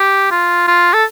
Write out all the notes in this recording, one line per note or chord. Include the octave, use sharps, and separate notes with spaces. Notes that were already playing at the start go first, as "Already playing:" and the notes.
Already playing: G4
F4
F4
A4